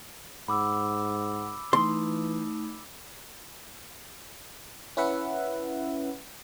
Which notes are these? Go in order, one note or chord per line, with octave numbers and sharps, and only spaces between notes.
G#2 F#5 B5 D6 E6
E3 A3 D#4 C6
C#4 E4 B4 E5 F#5